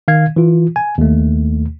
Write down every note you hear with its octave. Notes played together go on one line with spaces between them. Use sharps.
D#3 F5 G#6
E3 F4
G#5
D#2 A3